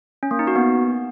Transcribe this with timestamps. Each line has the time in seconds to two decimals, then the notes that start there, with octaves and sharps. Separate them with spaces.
0.23 C#4
0.31 A#3
0.39 D#4
0.47 F#4
0.56 B3